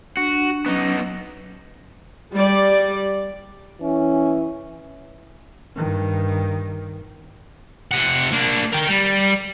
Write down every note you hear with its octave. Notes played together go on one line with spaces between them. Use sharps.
D4 F#4
F#3 B3 C#4 D#4
G3 D5
E3 C#4
G2 D#3
C3 F#5
A#3 D4
A#4 G5
G3